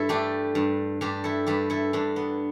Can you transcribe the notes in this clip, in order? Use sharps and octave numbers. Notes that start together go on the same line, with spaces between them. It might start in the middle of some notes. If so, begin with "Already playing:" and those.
Already playing: G2 E4 A4
A3 D4 G4
G2
G2 D4 G4
E4 A4
G2 G4 B4
E4 A4
G2 D4
B3